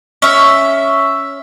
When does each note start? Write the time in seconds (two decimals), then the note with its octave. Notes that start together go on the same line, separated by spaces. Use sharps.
0.22 C#4 E5